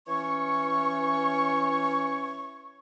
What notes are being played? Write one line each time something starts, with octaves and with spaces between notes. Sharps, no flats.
E3 C#4 C#5 C#6